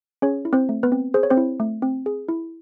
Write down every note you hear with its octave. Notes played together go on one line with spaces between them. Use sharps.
C#4 G#4 C#5
E4
C4 C5
A3
B3 B4
C4
G#4 C5
C#5
C4 C5
E4
A3
C4
G#4
E4